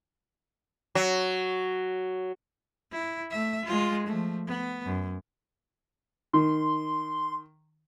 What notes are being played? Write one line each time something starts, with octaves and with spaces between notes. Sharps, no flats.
F#3
E4
A3 E5
G#3 F4
F3 A3
B3
F#2
D#3 C6